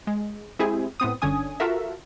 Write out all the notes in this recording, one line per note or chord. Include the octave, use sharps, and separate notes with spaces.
G#3
G#3 C4 E4 G4 G#4
A2 B3 C4 D#6
G1 D3 C#4 D4 G#5 D#6
F4 F#4 A4 A#4 E5